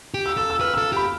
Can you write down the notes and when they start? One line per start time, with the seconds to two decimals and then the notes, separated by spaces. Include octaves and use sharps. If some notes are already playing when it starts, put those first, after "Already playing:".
0.14 G4
0.26 E6
0.37 A4 E6
0.50 E6
0.61 B4 F6
0.74 E6
0.78 A4
0.93 G4 B5